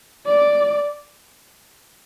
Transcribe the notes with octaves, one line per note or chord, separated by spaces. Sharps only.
D5